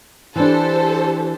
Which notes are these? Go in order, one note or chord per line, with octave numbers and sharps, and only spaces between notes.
E3 D4 G4 A4 C5